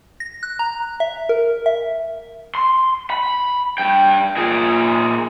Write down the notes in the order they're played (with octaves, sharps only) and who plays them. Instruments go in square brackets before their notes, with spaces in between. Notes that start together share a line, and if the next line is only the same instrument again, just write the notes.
[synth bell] A#6
F#6
A#5
E5
A#4
E5
[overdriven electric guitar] C6
B5
G2 G5
A#2 G#4